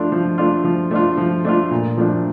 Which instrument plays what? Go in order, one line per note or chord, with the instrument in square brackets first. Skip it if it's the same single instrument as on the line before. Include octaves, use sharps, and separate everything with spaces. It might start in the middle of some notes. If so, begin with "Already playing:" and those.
Already playing: [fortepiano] F3 A3 D4 F4
F3
A3 D4 F4
F3
A3 D4 F4
F3
A3 D4 F4
A#2
F3 A3 D4